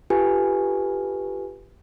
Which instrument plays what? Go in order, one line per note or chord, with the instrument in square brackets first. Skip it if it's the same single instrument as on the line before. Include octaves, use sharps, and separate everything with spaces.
[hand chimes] F4 G4 A4 B4 G#5